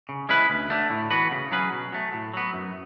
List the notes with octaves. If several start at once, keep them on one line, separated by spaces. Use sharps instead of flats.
C#3
G#3 C#4 E4 B4
D2
D3 A3
A2
E3 B3 F#4 B4
C#3
F#3 C#4 G#4 B4
B2
F#3 A3
A2
F#3 B3
F#2